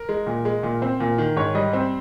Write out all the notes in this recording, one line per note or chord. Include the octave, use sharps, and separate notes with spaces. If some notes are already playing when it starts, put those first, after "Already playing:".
Already playing: A#4
G#3
A#2
G#3
A#2
C4
A#2
D#3
G#2 C#5
G3 D#5
C4